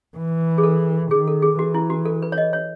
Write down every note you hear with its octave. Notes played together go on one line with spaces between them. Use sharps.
E3
G#4
A4
D#3 G#4
A4
G#4
E3 F#4
E4
F#4
A4
B4
C#5
D#5
C#5